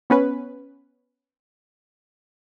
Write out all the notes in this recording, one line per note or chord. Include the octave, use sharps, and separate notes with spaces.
B3 C#4 B4